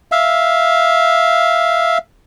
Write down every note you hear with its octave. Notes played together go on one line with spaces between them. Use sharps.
E5 F5